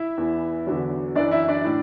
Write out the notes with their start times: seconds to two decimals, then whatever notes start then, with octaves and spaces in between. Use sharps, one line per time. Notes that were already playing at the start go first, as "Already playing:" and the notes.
Already playing: E4 E5
0.17 E2 E3
0.67 E2 D3 F#3
1.15 F#2 E3 D4 D5
1.31 E4 E5
1.48 D4 D5
1.64 A2